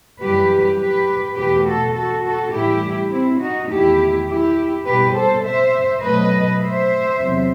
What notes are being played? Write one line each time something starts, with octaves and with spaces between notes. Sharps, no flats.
F#2 E3 G3 G4 B4
G4 B4
E2 B2 A3 G4 B4
F#4 A4
F#4 A4
F#4 A4
A2 E3 G3 E4 G4
C4 E4
D#4 F#4
E2 D#3 A3 E4 G4
E4 G4
B2 G3 G4 B4
A4 C5
C5 E5
B2 F#3 A3 B4 D#5
C5 E5
E2 C3 F#3